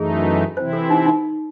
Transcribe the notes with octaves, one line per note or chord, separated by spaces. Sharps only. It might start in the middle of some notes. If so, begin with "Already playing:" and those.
Already playing: F#2 E3 A3 D#4 G#4
C3 E3 C4 E4 C5
A4
D#4
D#4